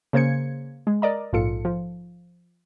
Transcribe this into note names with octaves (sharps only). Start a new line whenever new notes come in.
C#3 A#3 C5 G#6 C#7
G#3
A#4 D5 D#5 A#5
A#1 G#2 F4 A4 C#7
F3